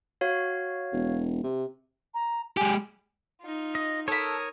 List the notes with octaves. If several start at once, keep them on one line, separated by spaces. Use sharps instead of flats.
F#4 C#5 F5
E1
C3
A#5
G#3 G4 G#5
D#4 F4
D#5
A4 A#4 C#5 B5 D#6